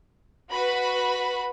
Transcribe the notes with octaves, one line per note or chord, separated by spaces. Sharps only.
F#4 B4 B5